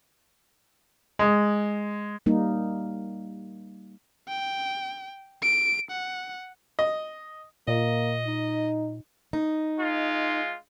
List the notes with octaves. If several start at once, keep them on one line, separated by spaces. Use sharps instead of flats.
G#3
G3 A#3 D#4
G5
D7
F#5
D#5
A#2 A#3 D#5
D#4
D#4
G#3 F4